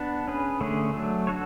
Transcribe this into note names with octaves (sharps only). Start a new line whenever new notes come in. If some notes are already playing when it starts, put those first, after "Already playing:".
Already playing: B3 D4
C#4 G#4 B4
D3 A3 C#4 G#4
F#3 A3 D4
F#4 A4 C#5